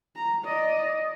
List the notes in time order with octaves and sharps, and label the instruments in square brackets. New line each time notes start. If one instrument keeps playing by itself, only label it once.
[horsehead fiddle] A#5
D5 D#5